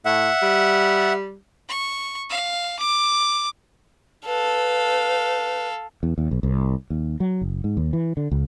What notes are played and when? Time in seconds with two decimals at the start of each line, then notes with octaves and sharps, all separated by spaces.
0.05 A2 E5 F#5
0.42 G3
1.69 C#6
2.30 F5
2.79 D6
4.26 A4 B4 F5
6.03 E2
6.18 D#2
6.31 B1
6.43 C2
6.90 D#2
7.20 F#3
7.41 F#1
7.64 G#2
7.77 D#2
7.93 E3
8.17 D3
8.31 C#2